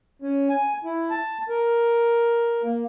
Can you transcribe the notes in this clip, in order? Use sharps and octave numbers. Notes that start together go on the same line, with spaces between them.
C#4
G#5
E4
A5
A#4
A#3